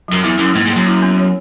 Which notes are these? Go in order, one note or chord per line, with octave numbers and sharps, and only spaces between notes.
F#2 F#3
E2 E4
F#2 E4
G#2 A#3
G#2
A#3
F#2
E4
B3
C#5